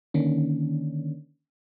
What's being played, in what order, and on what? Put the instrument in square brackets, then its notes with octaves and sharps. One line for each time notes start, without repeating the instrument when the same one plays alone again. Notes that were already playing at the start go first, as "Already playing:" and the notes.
[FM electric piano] D3 D#3 A#3 C#4 D4